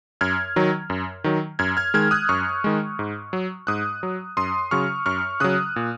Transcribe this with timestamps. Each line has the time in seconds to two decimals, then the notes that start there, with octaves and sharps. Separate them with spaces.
0.21 F#2 F6 G#6
0.56 D#3 F#3
0.90 F#2
1.24 D#3 F#3
1.59 F#2 F6 G#6
1.77 F6 G#6
1.94 D#3 G#3 F6 G#6
2.11 D#6 F#6
2.29 F#2 C#6 F6
2.64 D#3 G#3
2.99 G#2
3.33 F#3
3.67 G#2 D#6 F#6
4.03 F#3
4.37 F#2 C6 D#6
4.71 C#3 F#3 C#6 F6
5.06 F#2 C#6 F6
5.40 C#3 F#3 D#6 F#6
5.76 A#2